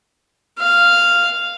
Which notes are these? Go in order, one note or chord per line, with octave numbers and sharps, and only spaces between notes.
F5